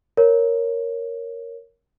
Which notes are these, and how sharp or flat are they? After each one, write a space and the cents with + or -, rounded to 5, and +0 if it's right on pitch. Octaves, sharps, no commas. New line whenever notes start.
A#4 +0 C#5 +0